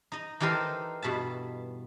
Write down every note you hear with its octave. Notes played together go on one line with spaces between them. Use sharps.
D#4 D#5
E3 D#4 G4 A4 A#4 C5
G2 B2 E5 A5